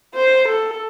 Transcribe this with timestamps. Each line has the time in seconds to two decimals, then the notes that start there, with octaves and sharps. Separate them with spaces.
0.15 C5
0.48 A4